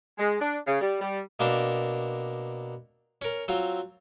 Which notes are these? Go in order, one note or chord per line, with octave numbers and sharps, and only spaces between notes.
G#3
D4
C#3
G3
G3
B2 A#3 C4 D4 A#4 A5
C#4 A#4
F#3 C4 F4